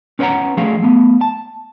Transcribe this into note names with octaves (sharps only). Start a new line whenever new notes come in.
C#4 B4 C#5 F5 F#5 A#5
F3 A3 G#4 F5
A3 B3
A5